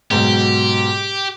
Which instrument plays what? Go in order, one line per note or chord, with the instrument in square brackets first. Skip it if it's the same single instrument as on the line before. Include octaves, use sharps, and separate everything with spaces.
[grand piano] G#2 B2 F#3 [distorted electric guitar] G4